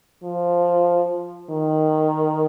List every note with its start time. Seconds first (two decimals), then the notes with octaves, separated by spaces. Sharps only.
0.24 F3
1.51 D#3